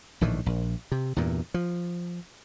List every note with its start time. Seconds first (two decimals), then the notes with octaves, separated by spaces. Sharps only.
0.21 A#1 A2 D#3 E3
0.46 A#1
0.92 C3
1.16 E2 G2 A#2
1.54 F3